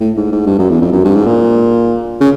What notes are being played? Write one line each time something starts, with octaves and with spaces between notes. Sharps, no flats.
A2
G#2
G#2
G2
F#2
E2
F2
F#2
G2
G#2
A#2
C#3